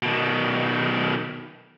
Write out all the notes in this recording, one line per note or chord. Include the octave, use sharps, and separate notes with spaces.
B2 D#3